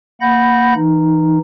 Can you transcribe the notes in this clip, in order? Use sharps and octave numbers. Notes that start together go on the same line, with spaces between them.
A#3 F#5 B5 G6 A#6
E3 D#4